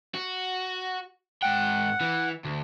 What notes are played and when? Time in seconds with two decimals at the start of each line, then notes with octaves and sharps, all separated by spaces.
0.14 F#4
1.42 G#2 F#5 G5
2.01 E3
2.45 D2